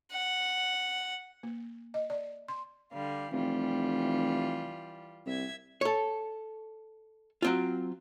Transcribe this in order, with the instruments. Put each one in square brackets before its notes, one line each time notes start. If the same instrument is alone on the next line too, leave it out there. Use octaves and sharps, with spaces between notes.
[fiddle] F#5
[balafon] A#3
D#5
D5
C6
[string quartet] D3 G3 F5
[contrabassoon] F1 [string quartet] E3 G3 F4
[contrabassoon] C2 [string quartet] E5 G#6
[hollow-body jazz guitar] A4 C#5
F#3 C4 F4